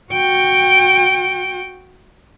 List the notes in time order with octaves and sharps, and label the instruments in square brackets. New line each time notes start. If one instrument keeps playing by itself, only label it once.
[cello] F#4 G5